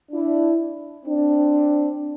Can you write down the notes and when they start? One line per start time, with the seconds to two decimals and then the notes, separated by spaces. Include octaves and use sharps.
0.12 D4 E4
1.06 C4 D4